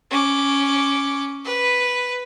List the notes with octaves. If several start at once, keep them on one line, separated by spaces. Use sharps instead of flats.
C#4 D6
B4